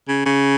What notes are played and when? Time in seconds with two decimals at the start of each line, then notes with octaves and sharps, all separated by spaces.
0.08 C#3
0.26 C#3